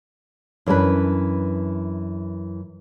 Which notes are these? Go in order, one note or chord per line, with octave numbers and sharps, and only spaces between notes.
F#2 E3 D4 G#4 B4